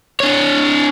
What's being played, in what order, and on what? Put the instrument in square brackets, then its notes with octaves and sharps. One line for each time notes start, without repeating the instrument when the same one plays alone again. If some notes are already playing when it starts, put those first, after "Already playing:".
[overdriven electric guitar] D4 C#5